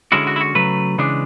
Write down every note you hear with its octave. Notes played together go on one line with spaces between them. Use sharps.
D3 G#3 C#4 E4 F#4
F#4
E4
F#4
C#3 F#3 A3 B4
C#3 E3 G#3 D4